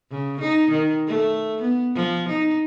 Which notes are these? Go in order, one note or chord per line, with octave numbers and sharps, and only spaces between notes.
C#3
D#4
D#3
A3
B3
F3
D#4